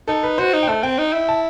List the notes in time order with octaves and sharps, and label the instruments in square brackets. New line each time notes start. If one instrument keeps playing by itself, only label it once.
[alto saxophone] D#4 [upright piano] A4
[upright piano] B4
[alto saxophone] F#4 [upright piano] C5
[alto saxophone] D#4
[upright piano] G5
[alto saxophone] A3 [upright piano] A5
[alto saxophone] C4 [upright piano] G5
[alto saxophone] D#4
E4
[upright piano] A5